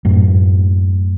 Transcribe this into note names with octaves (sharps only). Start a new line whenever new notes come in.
F#2 A2